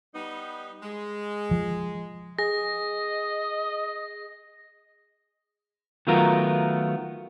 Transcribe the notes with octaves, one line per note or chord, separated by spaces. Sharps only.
G3 B3 D#4
G#3
F3
G#4 D#5 A#6
D#3 F#3 A3 B3 F4 A#4